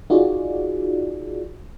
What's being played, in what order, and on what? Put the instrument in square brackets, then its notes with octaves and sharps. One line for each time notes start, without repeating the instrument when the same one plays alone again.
[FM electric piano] D#4 F4 F#4 G#4 D5